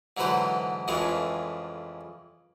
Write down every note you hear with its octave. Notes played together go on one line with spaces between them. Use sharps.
G#2 D3 E3 F#3 B4 C5
F2 C#3 E3 G#3 A3